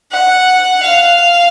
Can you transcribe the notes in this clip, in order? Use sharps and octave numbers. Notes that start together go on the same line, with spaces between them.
F#5
F5